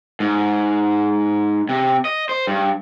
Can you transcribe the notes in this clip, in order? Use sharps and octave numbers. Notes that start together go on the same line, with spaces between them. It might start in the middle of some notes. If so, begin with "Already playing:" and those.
G#2
C3
D#5
C5
G2